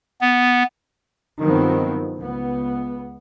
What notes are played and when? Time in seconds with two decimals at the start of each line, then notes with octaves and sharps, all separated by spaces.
0.21 B3
1.41 G2 D#3 F3 F#3 B3 C4
2.16 C#2 B3